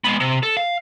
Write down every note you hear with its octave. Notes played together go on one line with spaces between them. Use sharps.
G#3 B3
C3
A4
F5